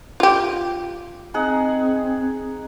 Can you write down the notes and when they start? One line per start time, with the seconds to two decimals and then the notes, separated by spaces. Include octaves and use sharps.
0.20 F4 G4
1.34 C4 D#4 G#4 F#5